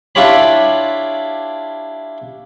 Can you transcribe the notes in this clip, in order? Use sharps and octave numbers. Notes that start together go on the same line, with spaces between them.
D4 E4 F4 G4 C#5 B5